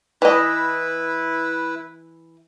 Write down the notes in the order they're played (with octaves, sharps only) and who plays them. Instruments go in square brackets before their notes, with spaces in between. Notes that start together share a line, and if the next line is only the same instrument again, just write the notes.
[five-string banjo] E3 D#5 [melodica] E4 B4